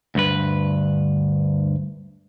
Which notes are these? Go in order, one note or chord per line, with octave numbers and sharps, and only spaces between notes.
D2 G2 B4